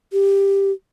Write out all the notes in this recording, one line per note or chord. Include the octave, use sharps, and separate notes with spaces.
G4